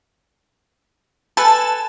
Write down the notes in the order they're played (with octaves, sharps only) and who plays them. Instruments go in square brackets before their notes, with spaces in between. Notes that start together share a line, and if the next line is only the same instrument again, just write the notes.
[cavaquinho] A4 B4 G#5 [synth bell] A5